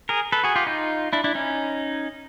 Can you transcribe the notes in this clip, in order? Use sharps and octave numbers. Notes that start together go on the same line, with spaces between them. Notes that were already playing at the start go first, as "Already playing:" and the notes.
G#4 A#4
A4 B4
F#4 G#4
F4 G4
D#4 F4
D4 E4
D4 E4
C#4 D#4